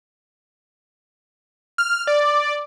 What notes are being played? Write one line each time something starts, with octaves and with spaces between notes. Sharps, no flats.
F6
D5